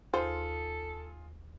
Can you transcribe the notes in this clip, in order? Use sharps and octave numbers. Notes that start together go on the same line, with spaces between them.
D#2 F4 G#4 A4 C5